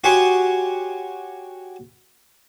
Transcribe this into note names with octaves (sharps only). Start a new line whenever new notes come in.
F#4 G4 C#5 G#5 C6 D#6